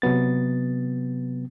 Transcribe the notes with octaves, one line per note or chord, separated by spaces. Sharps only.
C3 F#3 B3 A6